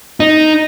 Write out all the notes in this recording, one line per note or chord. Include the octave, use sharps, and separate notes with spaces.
D#4